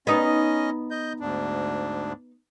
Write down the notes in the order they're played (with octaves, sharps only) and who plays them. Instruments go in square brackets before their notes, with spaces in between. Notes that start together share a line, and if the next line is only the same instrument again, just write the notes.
[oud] B3 D#4 [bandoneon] C#4 D#5
[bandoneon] D#5 G6
D2 G#2 D4